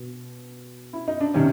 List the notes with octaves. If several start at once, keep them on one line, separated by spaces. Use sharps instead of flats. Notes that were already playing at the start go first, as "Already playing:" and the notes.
Already playing: B2
E4
D#4
D4
C3 D#3 C#4